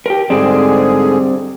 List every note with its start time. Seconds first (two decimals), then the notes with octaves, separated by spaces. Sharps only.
0.06 G4 A#4
0.30 G#2 D3 G3 C4 G#4 D5